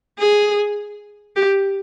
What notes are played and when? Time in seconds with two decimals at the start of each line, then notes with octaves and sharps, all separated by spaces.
0.19 G#4
1.36 G4